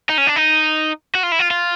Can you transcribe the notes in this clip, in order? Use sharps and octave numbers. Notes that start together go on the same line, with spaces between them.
D#4
C#4
D4
D#4
F#4
F4
E4
F4
F4